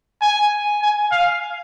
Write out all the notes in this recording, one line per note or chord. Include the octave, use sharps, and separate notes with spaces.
G#5
G#5
F5